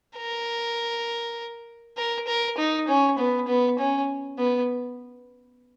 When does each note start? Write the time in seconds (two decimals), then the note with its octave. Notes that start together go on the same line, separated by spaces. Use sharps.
0.17 A#4
1.97 A#4
2.27 A#4
2.58 D#4
2.88 C#4
3.18 B3
3.48 B3
3.79 C#4
4.38 B3